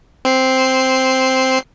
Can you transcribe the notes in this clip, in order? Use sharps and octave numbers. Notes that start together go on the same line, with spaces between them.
C4 C5 C7